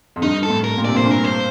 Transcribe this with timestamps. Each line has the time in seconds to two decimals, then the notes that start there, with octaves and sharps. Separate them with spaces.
0.16 F2
0.22 G2 D#4
0.43 A4
0.50 A2
0.64 A#4
0.78 A#2
0.85 C3 D5
0.95 A#2 C5
1.06 G2
1.11 A#4
1.24 C5